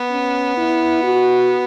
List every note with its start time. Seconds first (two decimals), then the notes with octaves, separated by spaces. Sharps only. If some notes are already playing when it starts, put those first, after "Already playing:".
Already playing: B3
0.11 C#4
0.57 E4
1.03 F#4